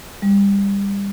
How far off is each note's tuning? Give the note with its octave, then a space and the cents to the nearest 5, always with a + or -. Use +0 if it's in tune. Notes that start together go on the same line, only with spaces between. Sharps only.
G3 +25